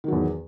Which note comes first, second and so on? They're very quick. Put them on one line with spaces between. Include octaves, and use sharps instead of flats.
D#3 F#3 E2